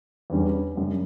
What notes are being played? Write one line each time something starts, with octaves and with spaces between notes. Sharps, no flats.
E2 D3 G3 C#4
F#2 C#3 G3 D4